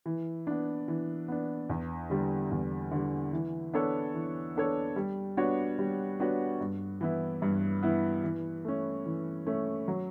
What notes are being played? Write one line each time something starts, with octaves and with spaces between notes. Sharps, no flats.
E3
B3 D4
E3
B3 D4
E2
D3 G3
E2
D3 G3
E3
B3 D4 A4 C#5
E3
B3 D4 A4 C#5
G3
B3 D4 F#4 C#5
G3
B3 D4 F#4 C#5
G2
E3 B3 E4
G2
E3 B3 E4
E3
A3 C#4
E3
A3 C#4
F#3